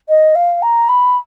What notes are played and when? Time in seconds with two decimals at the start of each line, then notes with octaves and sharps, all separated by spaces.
0.09 D#5
0.35 F5
0.62 A#5
0.89 B5